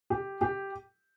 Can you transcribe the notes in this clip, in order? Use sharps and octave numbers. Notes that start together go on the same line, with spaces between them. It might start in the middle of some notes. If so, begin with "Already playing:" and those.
G4
G4